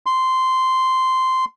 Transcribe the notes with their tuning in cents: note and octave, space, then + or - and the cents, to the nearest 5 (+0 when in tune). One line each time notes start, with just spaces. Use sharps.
C6 -10